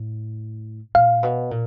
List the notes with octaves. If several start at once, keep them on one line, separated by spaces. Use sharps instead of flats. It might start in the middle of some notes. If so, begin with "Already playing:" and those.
Already playing: A2
A#2 F5
B2
A#2